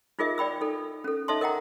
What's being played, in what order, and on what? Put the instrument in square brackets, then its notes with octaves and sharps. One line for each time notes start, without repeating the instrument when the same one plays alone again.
[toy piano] D#4 F4 G#4 A#4 D#5 E5
D5 G5 B5 E6
D#4 A4
C#4 A4
D#4 A4 D#5 E5 A5 C6
A#4 D#5 F#5 G5 A#5